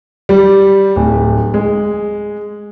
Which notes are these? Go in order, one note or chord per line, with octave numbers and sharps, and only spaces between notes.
G3
D1
G#3